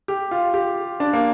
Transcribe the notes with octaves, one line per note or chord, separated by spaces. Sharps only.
G4
F4
G4
D4
A#3